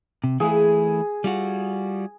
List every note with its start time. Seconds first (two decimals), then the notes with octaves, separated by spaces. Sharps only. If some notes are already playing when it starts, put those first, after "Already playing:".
0.24 C3
0.40 E3 A3 E4 G#4
1.24 G3 F4 F#4